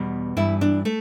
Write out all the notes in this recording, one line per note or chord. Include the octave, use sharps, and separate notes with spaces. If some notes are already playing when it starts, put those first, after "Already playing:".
Already playing: E2 B2 G3
G2 E3 G3 E4
D4
A3